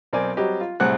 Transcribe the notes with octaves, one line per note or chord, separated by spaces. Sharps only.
B1 C4 A#4 D5 G#5
F#3 G3 C4 G4 D#5
F4
C2 A2 C4 G#4 F#5 F#6